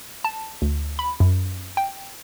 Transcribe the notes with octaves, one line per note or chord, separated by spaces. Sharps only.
A5
D2
B5
F#2
G5